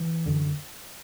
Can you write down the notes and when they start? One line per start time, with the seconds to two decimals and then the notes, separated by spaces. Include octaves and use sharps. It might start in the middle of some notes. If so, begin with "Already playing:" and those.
Already playing: E3
0.26 F#2 D3